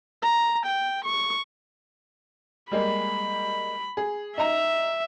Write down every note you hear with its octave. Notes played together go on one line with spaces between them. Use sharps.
A#5
G5
C#6
G3 G#3 A#3 B5
G#4
D#4 E5 A#5